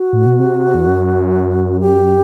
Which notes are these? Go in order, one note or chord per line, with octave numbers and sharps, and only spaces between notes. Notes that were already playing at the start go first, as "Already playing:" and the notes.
Already playing: F#4
A2
B2
C3
E2
F#2
G4